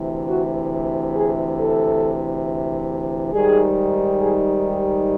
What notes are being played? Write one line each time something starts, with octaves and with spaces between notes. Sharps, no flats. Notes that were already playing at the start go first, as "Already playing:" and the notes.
Already playing: D2 C3 E3
F#4
G#4
A4
G#2 D#3 G3 G#4
G#4
G4